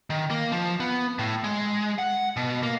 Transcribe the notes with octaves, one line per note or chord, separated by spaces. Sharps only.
D#3
A#3
F3
B3
A2
G#3
F#5
B2
A#3